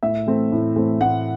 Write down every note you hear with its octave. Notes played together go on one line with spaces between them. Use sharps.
A2 E5
E3 A3 C4
A2
E3 A3 C4
A2 F#5